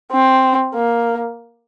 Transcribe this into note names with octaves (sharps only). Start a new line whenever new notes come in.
C4
A#3